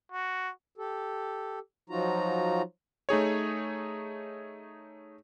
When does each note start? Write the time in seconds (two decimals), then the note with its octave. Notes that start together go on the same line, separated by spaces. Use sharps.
0.12 F#4
0.78 G4 A4
1.89 F3 F#3 D#4 F4 F#4 A#5
3.09 A3 D#4 G#4 C#5